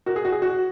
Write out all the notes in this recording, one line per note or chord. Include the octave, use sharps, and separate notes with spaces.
F#4 A#4
G#4
F#4
G#4
F#4